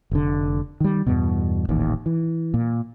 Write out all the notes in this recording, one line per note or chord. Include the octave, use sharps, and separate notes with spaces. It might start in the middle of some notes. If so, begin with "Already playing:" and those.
F1 D3
D#3 G3
E2 G2 B2
D#1 A1 D#2
E3
A#2